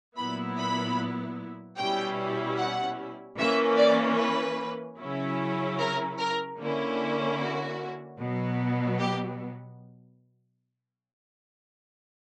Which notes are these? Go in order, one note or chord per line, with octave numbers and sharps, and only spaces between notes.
A#2 F#3 B3 E4 B5
B5
B2 G3 C#4 E4 G5
F#5
E3 A#3 C#4 E5
D5
B4
C#3 F#3 C#4 E4
A#4
A#4
D3 A#3 C#4 E4
F#4
B2 F#3 B3
G4